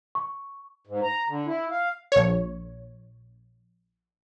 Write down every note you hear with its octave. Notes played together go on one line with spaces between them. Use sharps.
C#6
G#2
A#5
D3
E4
F5
A#1 C#5